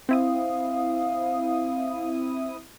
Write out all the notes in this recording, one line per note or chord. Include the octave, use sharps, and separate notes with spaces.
C4 E4 F5 D#6